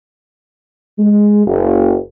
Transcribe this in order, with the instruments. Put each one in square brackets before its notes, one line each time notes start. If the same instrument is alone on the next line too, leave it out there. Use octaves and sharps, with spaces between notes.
[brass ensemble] G#3
F#1